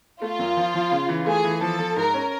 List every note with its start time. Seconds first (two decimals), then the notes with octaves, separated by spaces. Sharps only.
0.22 A3 F4
0.39 F#2
0.57 F3
0.74 F3
0.92 C#3
1.09 E3
1.26 A3 G#4
1.44 E3
1.61 F3 A4
1.79 F3
1.97 G#2 A#4
2.14 C#4